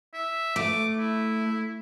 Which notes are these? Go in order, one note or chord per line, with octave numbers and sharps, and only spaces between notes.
E5
A3 D6
E4